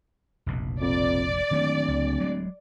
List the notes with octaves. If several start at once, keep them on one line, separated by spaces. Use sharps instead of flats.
F1 A#1 B2
F2 D5
D1 D#3 A3 A#3
C#2
F#3 G#3